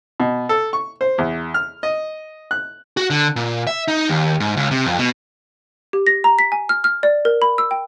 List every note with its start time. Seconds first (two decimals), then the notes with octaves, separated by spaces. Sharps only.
0.20 B2
0.49 A4
0.73 C#6
1.01 C5
1.18 E2
1.54 F6
1.83 D#5
2.51 F#6
2.97 F#4
3.10 D3
3.36 A#2
3.67 E5
3.88 D#4
4.09 D#2
4.40 G#2
4.57 C#2
4.71 C3
4.86 F2
4.98 B2
5.93 G4
6.07 A#6
6.24 A#5
6.39 B6
6.52 G#5
6.69 F6
6.84 F6
7.03 D5
7.25 A#4
7.42 B5
7.58 E6
7.71 G5